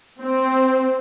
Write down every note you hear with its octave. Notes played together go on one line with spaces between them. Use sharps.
C4